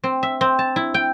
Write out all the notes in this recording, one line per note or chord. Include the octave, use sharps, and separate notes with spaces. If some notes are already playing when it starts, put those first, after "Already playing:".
C4
E5
C4
A5
E4
G5